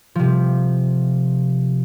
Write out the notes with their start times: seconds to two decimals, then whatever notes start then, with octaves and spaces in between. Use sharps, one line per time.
0.15 C3 F3